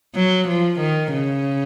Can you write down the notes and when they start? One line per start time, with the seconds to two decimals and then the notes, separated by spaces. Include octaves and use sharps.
0.15 F#3
0.47 F3
0.79 D#3
1.13 C#3